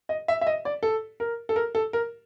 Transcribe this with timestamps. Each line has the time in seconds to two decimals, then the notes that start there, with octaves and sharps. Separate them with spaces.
0.09 D#5
0.28 E5
0.41 E5
0.47 D#5
0.65 D5
0.83 A4
1.20 A#4
1.49 A4
1.56 A#4
1.75 A4
1.93 A#4